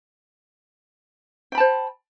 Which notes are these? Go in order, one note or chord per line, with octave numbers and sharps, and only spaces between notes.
C5 G5 A5 B5